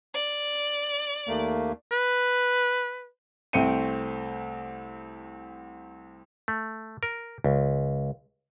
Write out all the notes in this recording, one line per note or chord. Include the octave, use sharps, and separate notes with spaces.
D5
D#2 A3 A#3
B4
C2 A3 C4 G5 C#7 D#7
A3
A#4
C#2